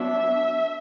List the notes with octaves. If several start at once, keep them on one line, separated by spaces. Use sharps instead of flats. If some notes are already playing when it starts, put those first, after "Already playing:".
Already playing: F#3 B3 D4 E5